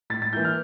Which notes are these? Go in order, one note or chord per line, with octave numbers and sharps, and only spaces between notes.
A2 A6
A6
E3 A#3 E4 G6
F6